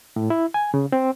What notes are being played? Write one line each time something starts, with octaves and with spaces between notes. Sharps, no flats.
A2
E4
G#5
C#3
C4